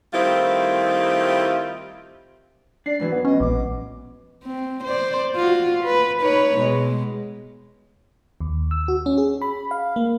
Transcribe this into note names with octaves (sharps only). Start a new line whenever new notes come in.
D#3 G3 A3 C4 E4 F4
D4 D5 C7
G#2 E3 F#3 B4
B3
C#4 D#5
A#1 D6
C4
C5 D5
F4 F#4
B4
D#4 B4 C#5
B2 G#3
D#2
E6
F#4
C#4
G#4
B5
F5
A#3